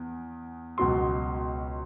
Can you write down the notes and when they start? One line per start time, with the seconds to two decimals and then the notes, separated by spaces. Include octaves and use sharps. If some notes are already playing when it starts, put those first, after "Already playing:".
Already playing: E2
0.78 C#2 B2 F#3 C6